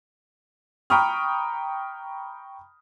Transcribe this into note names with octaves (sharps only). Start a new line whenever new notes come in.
G5 A#5 B5 C#6 D#6 F6